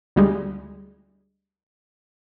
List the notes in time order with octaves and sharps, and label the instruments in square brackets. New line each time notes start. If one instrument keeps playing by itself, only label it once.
[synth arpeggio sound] D2 G3 G#3